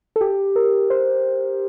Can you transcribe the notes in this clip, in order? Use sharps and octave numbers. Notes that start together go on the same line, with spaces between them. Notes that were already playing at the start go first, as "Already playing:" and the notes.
A4
G4
A#4
C5